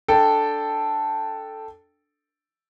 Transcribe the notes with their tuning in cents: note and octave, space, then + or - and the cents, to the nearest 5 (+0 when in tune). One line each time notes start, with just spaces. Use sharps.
D4 +0 A4 +0 G5 +0